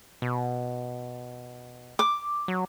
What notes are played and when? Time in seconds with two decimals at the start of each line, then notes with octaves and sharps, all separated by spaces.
0.22 B2
1.99 D6
2.48 F#3